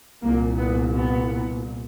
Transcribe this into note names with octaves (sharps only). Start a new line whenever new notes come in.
C2 A#2 A#3
B3
B3